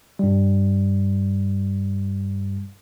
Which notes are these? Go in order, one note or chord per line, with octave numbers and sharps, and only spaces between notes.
G2 G3